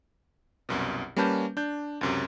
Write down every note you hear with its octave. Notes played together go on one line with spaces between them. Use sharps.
C2 F#2 B2
G3 A#3 C#4 B4 A5 G6
D4 G6
C#2 F#2 C3